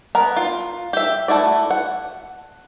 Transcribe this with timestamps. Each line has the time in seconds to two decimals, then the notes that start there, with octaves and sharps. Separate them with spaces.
0.15 B3 A#4
0.36 F4
0.93 G4 E5
1.28 A3 E4 F#4 D5
1.70 F#5